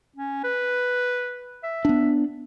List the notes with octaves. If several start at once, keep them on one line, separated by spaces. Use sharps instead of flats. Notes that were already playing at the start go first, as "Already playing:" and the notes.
C#4
B4
E5
B3 D4